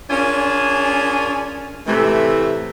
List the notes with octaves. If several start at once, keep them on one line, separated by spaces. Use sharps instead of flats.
C#4 D4 F4 G#4 A#4 C#5
A2 C3 E3 A3